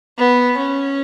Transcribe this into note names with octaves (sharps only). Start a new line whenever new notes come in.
B3
C#4